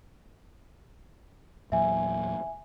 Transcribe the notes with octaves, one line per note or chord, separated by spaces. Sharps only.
E2 A#2 F#3 E5 G#5